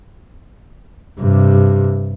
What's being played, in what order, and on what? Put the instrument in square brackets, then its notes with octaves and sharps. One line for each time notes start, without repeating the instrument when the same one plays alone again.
[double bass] G2 C3